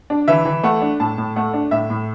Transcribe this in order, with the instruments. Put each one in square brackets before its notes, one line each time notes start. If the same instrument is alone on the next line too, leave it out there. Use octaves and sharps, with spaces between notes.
[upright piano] D4
E3 E5
E3
A3 F#5
D4
A2 A5
A2
A3 F#5
D4
A2 E5
A2